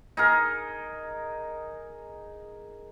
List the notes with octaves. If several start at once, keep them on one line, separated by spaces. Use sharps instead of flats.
D#4 G#4 A#4